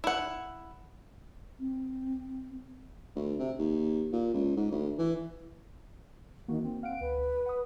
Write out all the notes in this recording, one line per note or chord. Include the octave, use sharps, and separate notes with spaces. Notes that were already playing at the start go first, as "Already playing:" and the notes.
E4 F#5
C4
D2
C3
D#2
A#2
C#2
G#2
D2
E3
D#3 A#3 F#4
C4
F5 F#5 D7
D2 B4
F#5 D#6